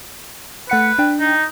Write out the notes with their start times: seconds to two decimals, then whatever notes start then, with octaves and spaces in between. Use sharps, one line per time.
0.70 A3 B4 F#5 C#7
0.99 D4 G5
1.20 D#4